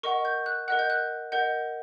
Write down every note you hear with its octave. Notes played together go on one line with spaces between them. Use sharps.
A#4 D#5 F#5 C#6
G6
F#6
A#4 D#5 F#5 F#6
G6
F#6
A#4 D#5 F#5 G6